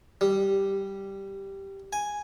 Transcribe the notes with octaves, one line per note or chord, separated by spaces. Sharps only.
G3
G#5